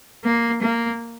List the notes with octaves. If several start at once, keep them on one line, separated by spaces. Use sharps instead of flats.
A#3
A#3